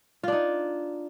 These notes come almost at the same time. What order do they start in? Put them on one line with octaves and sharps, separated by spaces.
F4 D4 D#4